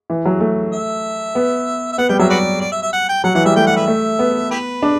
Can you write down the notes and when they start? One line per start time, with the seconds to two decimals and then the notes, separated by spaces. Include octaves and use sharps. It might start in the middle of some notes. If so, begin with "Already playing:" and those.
0.10 E3
0.25 F#3
0.40 A3
0.72 E5
1.35 B3
1.92 E5
1.98 B3 F#5
2.09 G3 G5
2.19 F#3 E5
2.30 F#4 B4 D5
2.61 D5
2.72 E5
2.82 E5
2.93 F#5
3.09 G5
3.24 F#3 F#5
3.35 E3 F#5
3.45 G3 E5
3.56 A3 G5
3.67 F#5
3.76 B4 E5
3.87 A3
4.19 B3
4.51 E4 G4 B4
4.82 D4